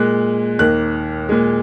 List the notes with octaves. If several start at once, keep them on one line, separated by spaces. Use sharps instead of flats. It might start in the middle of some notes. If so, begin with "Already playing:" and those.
Already playing: A#2 G#3 F#6
D#2 D#3 A#3 F#6
A#2 G#3